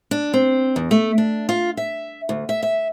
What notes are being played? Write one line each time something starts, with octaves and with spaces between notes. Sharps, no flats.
D4
C4
E2
A3
D4
F4
E5
D2
E5
E5